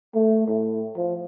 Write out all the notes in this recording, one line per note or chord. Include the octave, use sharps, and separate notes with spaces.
A3
A2
F3